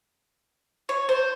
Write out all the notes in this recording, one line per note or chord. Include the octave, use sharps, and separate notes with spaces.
C#5
C5